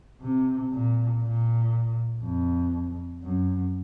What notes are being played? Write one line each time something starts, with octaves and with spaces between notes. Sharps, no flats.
C3
A#2
A#2
F2
F#2